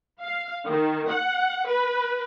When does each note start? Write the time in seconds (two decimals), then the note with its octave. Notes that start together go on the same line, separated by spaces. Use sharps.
0.22 F5
0.66 D#3
1.10 F#5
1.68 B4